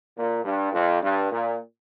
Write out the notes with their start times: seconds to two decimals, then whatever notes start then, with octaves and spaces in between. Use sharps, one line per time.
0.17 A#2
0.44 G2
0.73 F2
1.02 G2
1.31 A#2